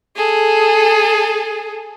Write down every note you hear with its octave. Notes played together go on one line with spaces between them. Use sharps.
G#4 A4